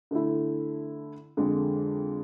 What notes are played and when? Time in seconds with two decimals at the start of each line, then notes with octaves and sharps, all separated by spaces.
0.11 D3 A3 E4
1.37 F2 D3 G#3